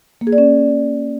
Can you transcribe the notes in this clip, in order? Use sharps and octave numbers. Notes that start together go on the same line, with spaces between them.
A#3
G#4
D5
C#4